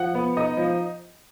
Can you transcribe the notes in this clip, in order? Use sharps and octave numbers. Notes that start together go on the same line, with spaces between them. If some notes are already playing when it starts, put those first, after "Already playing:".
Already playing: F3 F#5
B3
D#4 D#5
F3